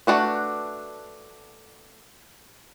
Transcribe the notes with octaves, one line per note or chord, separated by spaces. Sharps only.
A3 D4 F#4 B4